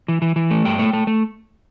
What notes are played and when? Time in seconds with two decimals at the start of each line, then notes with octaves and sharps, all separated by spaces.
0.08 E3
0.22 E3
0.36 E3
0.51 A3
0.65 G2 G5
0.79 A3
0.93 A3
1.07 A3